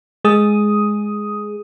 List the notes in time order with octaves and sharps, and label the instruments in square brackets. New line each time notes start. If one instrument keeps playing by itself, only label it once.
[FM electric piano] G#3 G#4 D#6